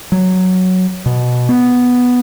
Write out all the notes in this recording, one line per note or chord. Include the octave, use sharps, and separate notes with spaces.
F#3
B2
B3